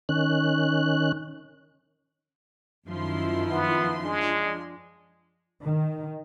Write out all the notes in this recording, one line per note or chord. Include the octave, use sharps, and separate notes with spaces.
D#3 C#4 F#6
F#2 D#3 F3 E4 C6
B3
G#3 D4
D#3